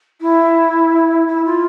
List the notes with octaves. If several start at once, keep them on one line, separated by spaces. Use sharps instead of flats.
E4
E4
F4